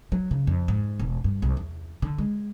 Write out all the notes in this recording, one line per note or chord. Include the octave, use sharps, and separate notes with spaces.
F#3
C#3
F2
G#2
E1
G2
C2
E2
D3
G#3